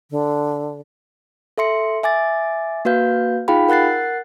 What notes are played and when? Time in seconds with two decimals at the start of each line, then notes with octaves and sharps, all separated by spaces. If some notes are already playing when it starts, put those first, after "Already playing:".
0.11 D3
1.58 A4 E5 C6 C#7
2.03 E5 G#5 D6 A6
2.85 A#3 F#4 B4 F5 G6
3.48 D#4 F4 G#4 F5 G5 B5
3.69 A#4 F#5 F#6 A6 C7